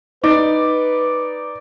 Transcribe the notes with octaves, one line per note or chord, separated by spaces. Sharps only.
D#4 B4 D5